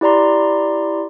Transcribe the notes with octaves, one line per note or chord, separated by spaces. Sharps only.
E4 G4 D5 A#5 C6